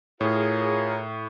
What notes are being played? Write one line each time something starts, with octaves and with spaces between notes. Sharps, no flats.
A2 F4 G#4 A#4 C#5